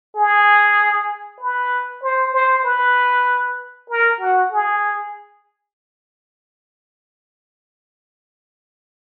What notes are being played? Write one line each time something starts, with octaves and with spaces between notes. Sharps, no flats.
G#4
B4
C5
C5
B4
A#4
F#4
G#4